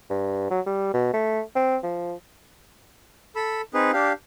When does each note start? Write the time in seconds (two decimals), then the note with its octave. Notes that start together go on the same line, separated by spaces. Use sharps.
0.10 G2
0.50 F#3
0.66 G3
0.93 B2
1.13 A3
1.55 C4
1.83 F3
3.36 A4 B5 E6
3.74 C4 D#4 G#4 B4
3.93 D4 G4 F5